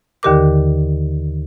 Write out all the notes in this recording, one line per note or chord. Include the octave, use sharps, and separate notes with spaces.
D#2 D3 D#3 G4 A#4 D6